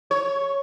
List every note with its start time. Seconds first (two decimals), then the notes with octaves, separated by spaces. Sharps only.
0.11 C#5